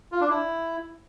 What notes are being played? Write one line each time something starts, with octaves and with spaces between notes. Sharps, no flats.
F4
D4
E4